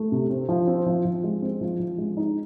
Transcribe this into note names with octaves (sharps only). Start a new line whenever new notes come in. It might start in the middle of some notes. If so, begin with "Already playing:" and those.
Already playing: A3
C3
C4
F3
C4
F3
F3
G#3
C4
F3
F3
G#3
D#4